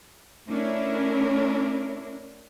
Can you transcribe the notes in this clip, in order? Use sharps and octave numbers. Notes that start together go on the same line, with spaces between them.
A3 C#4 D4 E4 A#4